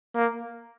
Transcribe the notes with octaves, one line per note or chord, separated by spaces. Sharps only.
A#3